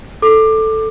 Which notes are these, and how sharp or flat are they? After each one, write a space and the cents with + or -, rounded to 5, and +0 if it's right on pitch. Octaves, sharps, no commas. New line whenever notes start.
A4 +0 D6 +20